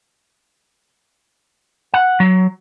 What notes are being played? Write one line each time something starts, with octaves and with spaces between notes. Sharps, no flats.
F#5
F#3